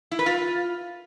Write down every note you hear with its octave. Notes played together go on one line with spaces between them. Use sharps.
E4
B4
F4